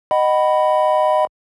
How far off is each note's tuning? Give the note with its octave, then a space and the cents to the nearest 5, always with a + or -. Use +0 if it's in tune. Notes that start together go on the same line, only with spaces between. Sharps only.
D#5 -10 F#5 +30 B5 +0